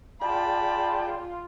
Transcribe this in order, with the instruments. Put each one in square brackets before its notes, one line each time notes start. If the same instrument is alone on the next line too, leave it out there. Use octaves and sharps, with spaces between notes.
[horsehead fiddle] F4 [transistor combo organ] G#4 D5 G5 [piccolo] A5 [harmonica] B5